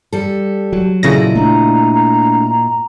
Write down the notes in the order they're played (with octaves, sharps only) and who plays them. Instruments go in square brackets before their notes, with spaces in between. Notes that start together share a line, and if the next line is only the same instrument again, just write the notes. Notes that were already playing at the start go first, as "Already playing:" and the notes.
[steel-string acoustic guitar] G3 A4
[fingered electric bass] F#3
[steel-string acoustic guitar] A#2 E4 D#5 [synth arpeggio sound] C#3 A#6 [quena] A4
[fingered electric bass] A3 B3 D4 [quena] A#5